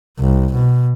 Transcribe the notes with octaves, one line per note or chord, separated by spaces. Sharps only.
C2
B2